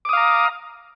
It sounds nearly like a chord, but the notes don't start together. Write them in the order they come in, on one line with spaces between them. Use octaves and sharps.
D6 D#6 F5 A#5